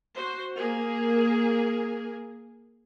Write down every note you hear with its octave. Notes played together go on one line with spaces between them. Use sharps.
F#4 C5
A#3 G#4 A#4